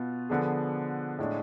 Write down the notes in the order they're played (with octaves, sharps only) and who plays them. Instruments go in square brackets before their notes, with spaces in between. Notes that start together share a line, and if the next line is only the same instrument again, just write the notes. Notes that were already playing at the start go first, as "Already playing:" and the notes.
Already playing: [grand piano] B2 B3 F4
D3 F3 B3 D4 G#4
A2 G#3 D4